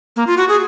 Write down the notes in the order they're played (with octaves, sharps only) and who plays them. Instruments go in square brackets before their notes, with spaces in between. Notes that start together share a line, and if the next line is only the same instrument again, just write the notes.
[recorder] A#3
F4
F#4
G#4